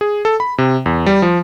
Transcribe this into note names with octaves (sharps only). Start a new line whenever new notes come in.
G#4
A4
B5
C3
E2
G3
F3